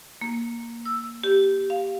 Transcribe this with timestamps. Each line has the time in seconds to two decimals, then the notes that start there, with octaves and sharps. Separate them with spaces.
0.21 A#3
0.85 E6
1.24 G4
1.70 F5